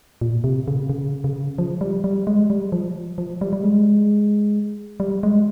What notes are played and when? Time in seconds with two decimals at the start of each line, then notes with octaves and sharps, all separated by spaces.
0.21 A#2
0.44 C3
0.68 C#3
0.90 C#3
1.24 C#3
1.58 F3
1.81 G3
2.04 G3
2.27 G#3
2.50 G3
2.72 F3
3.18 F3
3.41 G3
3.53 G3
3.63 G#3
5.00 G3
5.23 G#3